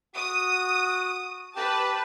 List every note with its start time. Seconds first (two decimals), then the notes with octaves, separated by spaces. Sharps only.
0.16 F#4 D#6
1.56 G4 B4 A5